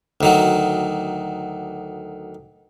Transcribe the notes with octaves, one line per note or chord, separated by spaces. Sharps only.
D2 D#3 F#3